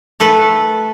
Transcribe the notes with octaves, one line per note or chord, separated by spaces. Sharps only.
A3 A4 B4